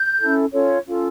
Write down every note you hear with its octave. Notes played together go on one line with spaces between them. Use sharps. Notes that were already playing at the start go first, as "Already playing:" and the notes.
Already playing: G6
C#4 E4 A4
C#4 F4 A4 C#5
C#4 F4 A4